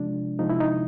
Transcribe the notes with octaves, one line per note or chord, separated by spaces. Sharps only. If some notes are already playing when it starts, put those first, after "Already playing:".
Already playing: C3 F3 G#3 D4
C3 F3 G#3 D#4
E4
D#4